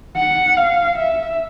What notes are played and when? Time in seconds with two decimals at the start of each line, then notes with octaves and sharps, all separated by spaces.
0.16 F#5
0.57 F5
0.98 E5